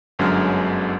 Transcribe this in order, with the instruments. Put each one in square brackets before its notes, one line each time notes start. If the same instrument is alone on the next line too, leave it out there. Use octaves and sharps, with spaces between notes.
[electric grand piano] G1 F#2 D3 F#3 G#3 F6